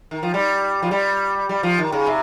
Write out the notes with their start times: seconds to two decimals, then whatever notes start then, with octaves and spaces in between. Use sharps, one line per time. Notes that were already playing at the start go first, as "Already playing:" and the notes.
0.11 D#3
0.23 F3
0.34 G3
0.83 F3
0.91 G3
1.49 G3
1.63 F3
1.78 D#3
1.92 C#3
2.07 C3